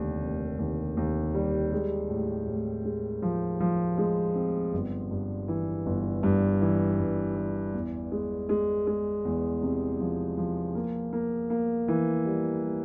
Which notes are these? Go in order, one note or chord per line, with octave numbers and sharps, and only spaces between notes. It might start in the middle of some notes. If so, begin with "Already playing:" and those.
Already playing: F1 D#2 D3 G3
F1
D#2
D#2
G3
G#3
A2
A2
G#3
F3
F3
G#3
C4
G1
G2
E3
G1
G2
E3
G1
E3
E2
G#3
G#3
G#3
E2
C3
F3
F3
A#3
A#3
A#3
E3
G3
G3